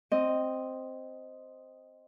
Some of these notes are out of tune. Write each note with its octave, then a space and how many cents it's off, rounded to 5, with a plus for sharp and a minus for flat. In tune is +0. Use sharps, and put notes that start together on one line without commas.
C4 +0 D#5 +0